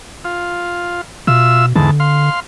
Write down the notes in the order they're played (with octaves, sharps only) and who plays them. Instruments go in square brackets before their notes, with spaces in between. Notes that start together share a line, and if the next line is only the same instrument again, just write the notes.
[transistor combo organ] F4
[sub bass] B2 [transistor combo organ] F4 E5 E6
[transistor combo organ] E2 G#2 A5 [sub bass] D3
[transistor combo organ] F5 C6